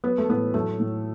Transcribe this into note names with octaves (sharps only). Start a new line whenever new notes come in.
F#3 B3
A3
A2 B3
F#3 A3
A2